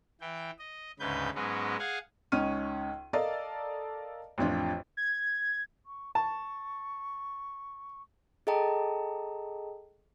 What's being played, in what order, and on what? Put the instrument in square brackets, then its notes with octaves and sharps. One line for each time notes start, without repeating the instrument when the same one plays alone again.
[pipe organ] E3 G5
D#5
D2 G#2 C#3 B4 G6
G#2 F#3 G#3 B3 C#4
G#4 F5 F#5 G#5
[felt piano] C#2 C#4 D#4 C#6 F6 D#7
A4 A#4 D5 D#5 F5 A5
A1 F2 D4 F4
[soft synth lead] G#6
[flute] C#6
[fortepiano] A5 [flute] C#6
[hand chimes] G#4 A4 D#5 G5 A5 A#5